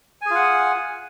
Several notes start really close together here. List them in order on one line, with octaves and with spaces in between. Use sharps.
G#5 G#4 F4 F#5